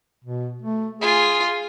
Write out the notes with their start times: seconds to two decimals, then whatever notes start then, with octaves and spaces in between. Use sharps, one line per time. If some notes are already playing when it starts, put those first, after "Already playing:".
0.24 B2
0.62 A3
1.01 F4 G#4 G#5